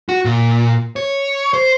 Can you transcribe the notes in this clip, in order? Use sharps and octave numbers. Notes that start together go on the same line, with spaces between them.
F#4
A#2
C#5
C5